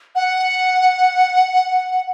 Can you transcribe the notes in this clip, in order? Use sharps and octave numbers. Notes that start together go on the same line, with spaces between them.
F#5